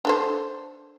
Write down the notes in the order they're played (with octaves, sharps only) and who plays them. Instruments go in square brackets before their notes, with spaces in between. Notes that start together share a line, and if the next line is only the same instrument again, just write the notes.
[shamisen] D4 A4 C5